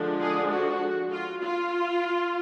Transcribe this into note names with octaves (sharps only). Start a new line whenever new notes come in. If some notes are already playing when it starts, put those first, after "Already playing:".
Already playing: D3 F3 G#3 D4
G#4
F#4
F4
F4